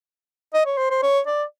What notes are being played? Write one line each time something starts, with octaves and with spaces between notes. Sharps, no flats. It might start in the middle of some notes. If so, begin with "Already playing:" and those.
D#5
C#5
C5
C5
C#5
D5